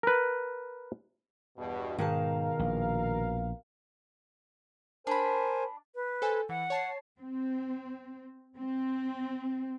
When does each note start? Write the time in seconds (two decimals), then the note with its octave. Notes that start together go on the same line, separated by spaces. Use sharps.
0.03 A#4 B4
1.58 E2 G2 B2
1.98 G#2 B2 D#3 G#4 A#4 F5 A5
2.59 A#1
5.07 D4 A#4 C5 G#5 B5
5.95 B4
6.22 A4 C5 G#5
6.49 E3 F#5
6.70 C#5 A5 C7
7.21 C4
8.57 C4